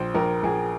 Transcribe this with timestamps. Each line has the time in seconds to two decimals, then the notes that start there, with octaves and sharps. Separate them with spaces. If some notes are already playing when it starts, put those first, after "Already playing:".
Already playing: A#1 C5
0.14 A#1 A#4
0.43 A#1 G#4